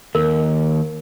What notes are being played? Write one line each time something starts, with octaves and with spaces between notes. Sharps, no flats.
D#2 A#4